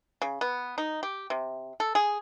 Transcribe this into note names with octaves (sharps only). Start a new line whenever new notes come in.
C#3
B3
D#4
G4
C3
A4
G#4